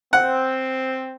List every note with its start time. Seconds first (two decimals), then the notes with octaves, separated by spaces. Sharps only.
0.13 C4 F#5